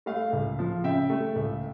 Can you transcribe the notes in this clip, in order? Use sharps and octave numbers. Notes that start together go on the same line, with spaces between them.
A3 F5
C#2
F3
C#3 E5 G5
A3
C#2